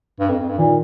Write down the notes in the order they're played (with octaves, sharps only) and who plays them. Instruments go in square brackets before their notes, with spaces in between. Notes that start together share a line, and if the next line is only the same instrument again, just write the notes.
[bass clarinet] G2
F2
F2
G2
[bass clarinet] A#2 [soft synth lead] D#3